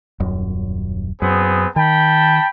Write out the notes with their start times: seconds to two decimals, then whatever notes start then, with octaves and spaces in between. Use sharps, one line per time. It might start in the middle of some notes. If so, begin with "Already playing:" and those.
0.20 D#1 F#2
1.22 F#2 B3 C4 G#4
1.76 D#3 G5 A5 B5